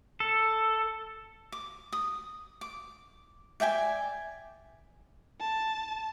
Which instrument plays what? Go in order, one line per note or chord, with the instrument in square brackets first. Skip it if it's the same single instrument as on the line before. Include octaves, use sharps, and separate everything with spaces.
[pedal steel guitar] A4
[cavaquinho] D6
D#6
D6
D5 E5 G5 G#5
[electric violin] A5